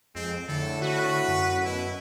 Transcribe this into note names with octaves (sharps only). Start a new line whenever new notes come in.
F2 G#3 C4
A2 D3 A4
F#4 B4
F#2
B2 E4